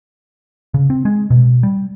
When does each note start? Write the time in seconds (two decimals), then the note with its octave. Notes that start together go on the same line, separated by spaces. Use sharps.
0.74 C#3
0.90 C4
1.05 G#3
1.30 B2
1.63 G3